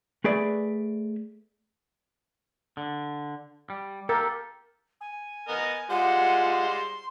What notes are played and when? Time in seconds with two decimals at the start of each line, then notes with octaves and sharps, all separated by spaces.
0.24 A3 G#4 B4 D5 E5
2.77 D3
3.70 G3
4.09 G4 A4 A#4
5.00 G#5
5.48 B3 A#4 D#5
5.90 G3 G#3 F4 C5 F#5
6.51 C6